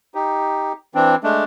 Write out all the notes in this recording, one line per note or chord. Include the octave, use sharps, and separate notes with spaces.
D#4 G4
E3 C4 D4
G#3 A3 D4